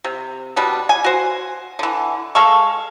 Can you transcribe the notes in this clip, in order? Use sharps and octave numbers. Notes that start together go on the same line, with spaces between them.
C3
B2 G3 D4
G#5
F#4 C5
D3 E3
G#3 A4 F5 C#6